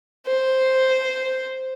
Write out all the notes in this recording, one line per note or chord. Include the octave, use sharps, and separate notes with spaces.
C5